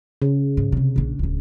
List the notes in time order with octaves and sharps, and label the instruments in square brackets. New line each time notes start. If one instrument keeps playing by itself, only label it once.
[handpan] C#3
[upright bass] G#2
D#2 C3
A#1 D4
D1 D4